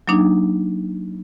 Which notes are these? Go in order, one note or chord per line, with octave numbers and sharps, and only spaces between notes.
F#3 A#3 D4 D#4